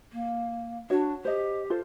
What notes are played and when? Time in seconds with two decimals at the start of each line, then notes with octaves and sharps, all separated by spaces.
0.12 A#3
0.90 D4 F#4 C#5
1.25 G4 C5 D#5
1.70 F4 A4 C5